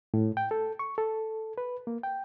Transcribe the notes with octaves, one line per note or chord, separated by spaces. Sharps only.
A2
G5
A4
C#6
A4
B4
A#3
G5